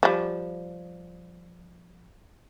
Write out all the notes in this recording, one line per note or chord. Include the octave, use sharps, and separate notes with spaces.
F3 G3